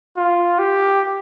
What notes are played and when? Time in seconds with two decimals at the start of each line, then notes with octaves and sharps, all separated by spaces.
0.16 F4
0.59 G4